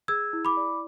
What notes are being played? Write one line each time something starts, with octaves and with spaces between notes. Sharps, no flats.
G#4 E6 G#6
E4
B5 D6
D5